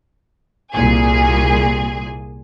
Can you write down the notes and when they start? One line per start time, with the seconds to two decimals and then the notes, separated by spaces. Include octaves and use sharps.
0.73 C2 A#2 G#4 G#5